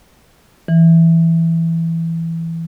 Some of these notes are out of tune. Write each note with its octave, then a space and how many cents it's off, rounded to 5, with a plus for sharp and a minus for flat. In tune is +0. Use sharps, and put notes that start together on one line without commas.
E3 +5